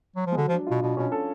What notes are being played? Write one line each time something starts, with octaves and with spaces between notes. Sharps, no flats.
F#3
F3
G#3
D3 F#3
F3
D4
B2 F4
B2 D4
B2 C#4
A4